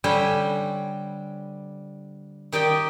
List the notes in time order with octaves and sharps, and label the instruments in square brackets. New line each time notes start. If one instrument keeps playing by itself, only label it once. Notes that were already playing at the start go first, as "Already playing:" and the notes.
[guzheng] D3 G3 C5 C#5 G#5 B5
D#3 G4 D5 D#5 G5